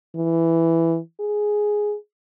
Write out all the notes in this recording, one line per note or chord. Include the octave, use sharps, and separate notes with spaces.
E3
G#4